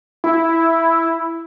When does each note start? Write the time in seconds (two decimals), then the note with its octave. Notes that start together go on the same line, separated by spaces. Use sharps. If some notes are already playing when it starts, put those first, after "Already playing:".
0.24 E4